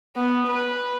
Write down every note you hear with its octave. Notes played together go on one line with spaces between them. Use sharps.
B3
B4